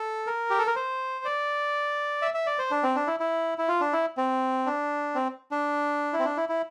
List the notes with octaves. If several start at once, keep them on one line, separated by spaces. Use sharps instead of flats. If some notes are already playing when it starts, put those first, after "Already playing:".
Already playing: A4
A#4
G4
A4
A#4
C5
D5
E5
E5
D5
C5
D4
C4
D4
E4
E4
E4
F4
D4
E4
C4
D4
C4
D4
E4
C4
D4
E4
E4